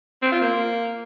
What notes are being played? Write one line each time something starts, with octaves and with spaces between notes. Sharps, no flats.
C4
F4
A#3